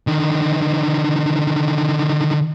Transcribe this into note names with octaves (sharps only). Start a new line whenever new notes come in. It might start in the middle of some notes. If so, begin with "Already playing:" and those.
D3 D#3